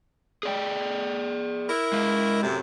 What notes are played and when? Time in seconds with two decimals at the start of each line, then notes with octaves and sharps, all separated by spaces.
0.43 G#4 D5 G5
1.69 E4 A#4
1.93 G#3 F5
2.43 F#2 A2 C3